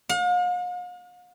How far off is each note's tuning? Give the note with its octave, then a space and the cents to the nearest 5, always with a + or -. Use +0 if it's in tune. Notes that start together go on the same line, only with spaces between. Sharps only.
F5 +45